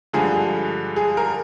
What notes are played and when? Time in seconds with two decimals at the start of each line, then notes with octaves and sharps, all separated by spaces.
0.13 G2 D3 F3 G#3 G#4
0.96 G#4
1.17 A#4